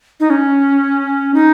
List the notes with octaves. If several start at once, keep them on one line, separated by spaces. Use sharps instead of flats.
D#4
C#4
D#4